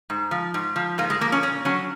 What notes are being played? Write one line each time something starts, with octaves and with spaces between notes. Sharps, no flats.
G#2
F3
G#2
F3
G#2 A#3
G#3
F3 A#3
C#4
A#2 C#4
F#3 C#4